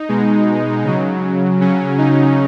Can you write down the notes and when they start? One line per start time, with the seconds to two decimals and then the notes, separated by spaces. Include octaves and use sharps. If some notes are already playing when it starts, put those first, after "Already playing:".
Already playing: D#4
0.09 B2 G#3
0.84 C#3 F#3
1.60 C#3 F#3 C#4
1.98 D#4